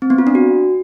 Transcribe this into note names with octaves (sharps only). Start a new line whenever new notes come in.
C4
B3
F4
D4
F#4